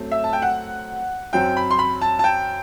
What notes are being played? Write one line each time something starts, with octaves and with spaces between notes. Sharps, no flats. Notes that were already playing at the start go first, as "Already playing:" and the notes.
Already playing: F#2 F#3 A3 C4
E5
A5
G5
F#5
F#2 F#3 C4 G5
B5
C6
B5
A5
A5
G5